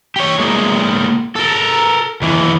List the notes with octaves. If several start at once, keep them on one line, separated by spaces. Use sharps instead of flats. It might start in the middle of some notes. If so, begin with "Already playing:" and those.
G4 C#5
A#2 G#3
A4 A#4
D#2 E3